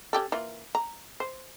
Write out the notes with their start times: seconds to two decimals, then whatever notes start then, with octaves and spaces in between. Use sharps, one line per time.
0.13 C#4 G4 A4
0.32 E3 A#3 F4
0.75 A#5
1.20 C5